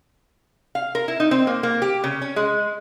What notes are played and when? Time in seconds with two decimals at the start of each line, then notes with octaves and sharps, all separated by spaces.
0.75 F5
0.95 A#4
1.08 E4
1.20 D#4
1.31 C4
1.47 A#3
1.63 A#3
1.82 G4
2.04 C#3
2.21 C#4
2.36 G#3